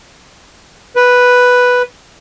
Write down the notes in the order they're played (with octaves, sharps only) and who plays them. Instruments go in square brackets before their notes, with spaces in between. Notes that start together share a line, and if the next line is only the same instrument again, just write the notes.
[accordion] B4